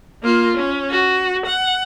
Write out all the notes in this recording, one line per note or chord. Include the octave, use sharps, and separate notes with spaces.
A#3 F4
C#4
F#4
F#5